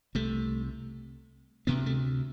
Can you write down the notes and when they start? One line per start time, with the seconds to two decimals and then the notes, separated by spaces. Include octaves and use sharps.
0.15 C2 C3 A3
1.67 D2 C3 B3
1.86 A3